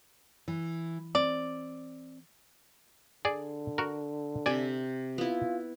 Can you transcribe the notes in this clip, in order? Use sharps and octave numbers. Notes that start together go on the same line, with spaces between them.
E3
C4 D5
D3 G#4 D5
F#4 A#4
C3 D5 E5 G#5
B3 E4 F4